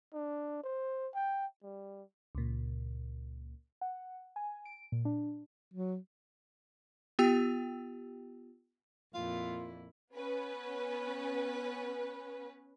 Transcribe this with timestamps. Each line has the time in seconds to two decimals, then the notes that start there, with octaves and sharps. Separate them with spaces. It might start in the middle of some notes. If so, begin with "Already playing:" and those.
0.13 D4
0.64 C5
1.15 G5
1.63 G3
2.35 C#2 A#2
3.81 F#5
4.36 G#5
4.65 D7
4.92 A#2
5.05 D4
5.74 F#3
7.19 B3 F4 G4 G5 E6
9.14 F2 A#2 E4 F4 F5
10.13 B3 C#4 B4